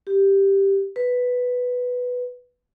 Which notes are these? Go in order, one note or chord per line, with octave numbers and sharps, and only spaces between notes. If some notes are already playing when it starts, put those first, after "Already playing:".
G4
B4